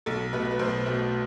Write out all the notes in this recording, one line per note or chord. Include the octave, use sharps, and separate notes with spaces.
B1 A4
B2 A3 B4
B4
B1 C5
B2 A3